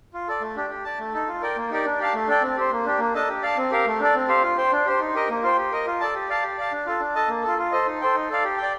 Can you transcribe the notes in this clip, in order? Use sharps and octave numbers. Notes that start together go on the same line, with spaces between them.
F4
A4 D5
A3
D4 G4
G4
D5 A5
A3
D#4 A4
F4
A#4 D5 G5
A#3
D#4 G4 A#4 D5
D4
G4 D5 F5 A5
A3
D4 A4 D5 G5
C4
G4 C5
A#3
D4 G4
A#3
D4 A4 D#5 A5
G4
D5 F5 A5
C4
G4 A#4 F5
A3
D4 A4 D5
C4
G4 C5 F5
F4
C5 G5
D4
G4 C5
D#4
G4 A#4 D#5
A#3
F4 C5 G5
G4
A#4 D#5
F4
A4 D5 A5
G4
D5 F5 A5
G4
D5 F5 A5
D4
F4 A4
D4
A4 D#5 A5
A#3
F4 A4
F4
A4 C5 D#5
D#4
A4 C5 G5
D#4
A4 D5 F5
G4
G5
D5